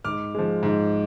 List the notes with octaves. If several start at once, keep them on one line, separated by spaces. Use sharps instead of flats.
G#2 D6 F6
F3 G#3
G#2